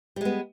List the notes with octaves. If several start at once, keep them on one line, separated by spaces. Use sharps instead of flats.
G3 G#3 B3